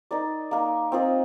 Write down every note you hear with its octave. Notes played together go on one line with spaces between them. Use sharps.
D#4 A#4 D5
A#3 D#4 A#4
C4 F4 A#4 D#5